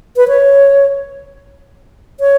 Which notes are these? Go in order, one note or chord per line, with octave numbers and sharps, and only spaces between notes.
B4
C#5
C#5